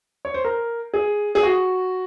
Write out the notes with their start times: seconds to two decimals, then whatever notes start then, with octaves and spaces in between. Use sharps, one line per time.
0.25 C#5
0.34 C5
0.45 A#4
0.94 G#4
1.35 G#4
1.43 F#4